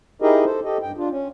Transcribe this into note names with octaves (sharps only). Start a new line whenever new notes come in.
D#4 E4 G4 G#4 A#4 D#5
A4 C5
G4 A4 D#5
G2 G5
D4 F4
C#4